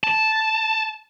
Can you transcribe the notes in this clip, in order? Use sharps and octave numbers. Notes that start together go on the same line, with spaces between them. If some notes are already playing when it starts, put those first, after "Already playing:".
A5